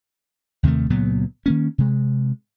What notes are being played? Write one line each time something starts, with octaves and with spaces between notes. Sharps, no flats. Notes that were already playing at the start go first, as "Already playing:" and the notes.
D#2 C3 D#3 A3
C#2 A#2 F#3 B3
D#3 A#3 C#4
C3 G#3